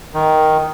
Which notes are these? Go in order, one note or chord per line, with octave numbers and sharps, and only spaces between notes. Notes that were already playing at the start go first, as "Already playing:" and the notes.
D#3